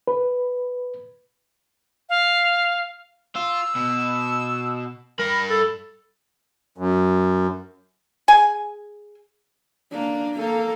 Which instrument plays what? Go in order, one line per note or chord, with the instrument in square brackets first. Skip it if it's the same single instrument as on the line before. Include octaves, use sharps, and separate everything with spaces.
[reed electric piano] B4
[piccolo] F5
[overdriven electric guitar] F4 [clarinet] E6
[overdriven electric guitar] B2
[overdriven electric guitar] G2 B5 [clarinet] A#4
[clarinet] A4
[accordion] F#2
[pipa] G#4 G#5
[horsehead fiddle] A#3 D4
A#3 A4